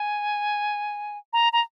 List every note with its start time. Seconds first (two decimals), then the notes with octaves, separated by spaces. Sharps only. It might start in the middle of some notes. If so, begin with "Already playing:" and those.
Already playing: G#5
1.33 A#5
1.53 A#5